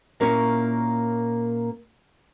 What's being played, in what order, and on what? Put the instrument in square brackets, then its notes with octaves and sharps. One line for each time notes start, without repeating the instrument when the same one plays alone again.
[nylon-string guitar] A#2 A#3 C#4 E4 C#5